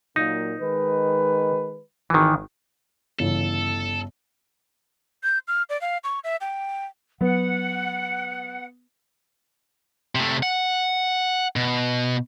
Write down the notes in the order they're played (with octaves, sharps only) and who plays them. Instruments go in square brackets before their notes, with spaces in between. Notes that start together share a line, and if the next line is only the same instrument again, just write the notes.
[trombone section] A#2 F#3 A#3 [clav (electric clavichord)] D#4
[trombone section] D#3 G#3 B4
[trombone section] G#1 [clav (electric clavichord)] D#3 E3
[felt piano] G1 C#3 E3 [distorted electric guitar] A4
[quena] G6
F6
D5
F5
C#6
E5
G5
[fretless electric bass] F#3 [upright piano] B3 [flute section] F#5
[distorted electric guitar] C3 A3
F#5
B2